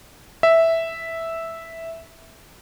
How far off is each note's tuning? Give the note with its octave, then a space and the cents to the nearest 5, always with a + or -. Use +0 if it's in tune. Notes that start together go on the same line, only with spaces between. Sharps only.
E5 -5